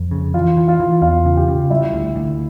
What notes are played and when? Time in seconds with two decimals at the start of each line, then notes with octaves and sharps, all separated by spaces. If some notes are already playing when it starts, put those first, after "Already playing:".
Already playing: F2
0.11 C#3
0.34 E3 F4 F5
0.57 E3
0.68 F4 F5
0.80 E3
1.02 E2 F4 F5
1.25 C#3
1.37 G4 G5
1.48 C#3
1.70 G3 E4 E5
1.93 D2
2.16 D2